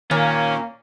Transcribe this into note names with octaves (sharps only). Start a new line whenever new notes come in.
A#2 D#3 A#3 C#4